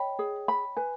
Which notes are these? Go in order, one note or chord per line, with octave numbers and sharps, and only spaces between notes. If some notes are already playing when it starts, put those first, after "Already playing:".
Already playing: C#5 D#5 G5 B5
G#4
B5
B4 G#5